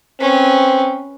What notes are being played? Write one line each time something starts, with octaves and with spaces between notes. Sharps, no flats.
C4 C#4 B4